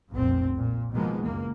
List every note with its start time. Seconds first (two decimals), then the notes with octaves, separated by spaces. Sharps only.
0.12 F1 B1 F2 A#2 C4
0.55 A#2
0.92 B2 D#3 F3 G#3 A#3 B3
1.22 F#1 C#2 E3 A#3